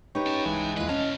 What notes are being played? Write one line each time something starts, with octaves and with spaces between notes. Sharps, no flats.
D#4 G4 B4 C#5
C#4 G5 A5
C2 E3 G#3
D#2 B3 E4 F4 B4 D#5
B2 C#4 D#5 F5 A5